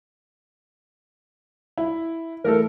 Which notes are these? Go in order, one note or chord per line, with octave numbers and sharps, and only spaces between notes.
E4
E3 A3 A4 A#4